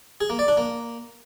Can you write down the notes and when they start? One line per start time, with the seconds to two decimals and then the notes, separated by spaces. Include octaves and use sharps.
0.21 G#4
0.30 A#3
0.39 D5
0.48 D4
0.57 A#3